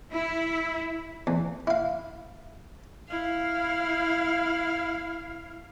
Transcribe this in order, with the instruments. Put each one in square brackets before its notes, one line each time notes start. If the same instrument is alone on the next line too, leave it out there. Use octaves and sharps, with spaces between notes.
[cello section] E4
[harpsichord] E2
E4 F5
[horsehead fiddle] E4 F5